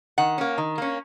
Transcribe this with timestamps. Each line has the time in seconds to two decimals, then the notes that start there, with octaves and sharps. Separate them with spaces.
0.18 D#3 F#5
0.38 A#3 C#4
0.58 D#3
0.78 A#3 C#4